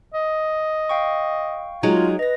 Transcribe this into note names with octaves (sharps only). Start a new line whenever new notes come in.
D#5
F5 G5 C#6
F#3 G#3 D#4 F4
B4 D#5 A#6